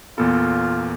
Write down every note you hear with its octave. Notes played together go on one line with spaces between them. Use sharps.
E2 A#2 B3 F4 A4